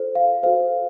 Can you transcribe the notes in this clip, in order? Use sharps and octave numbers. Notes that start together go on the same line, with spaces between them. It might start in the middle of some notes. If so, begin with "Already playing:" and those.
Already playing: F4 A4 C5
F5
F#4 A4 C5 F5